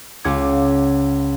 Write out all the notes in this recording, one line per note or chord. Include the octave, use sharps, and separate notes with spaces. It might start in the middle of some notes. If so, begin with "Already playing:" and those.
C#2 F5 F#5 D6 G#6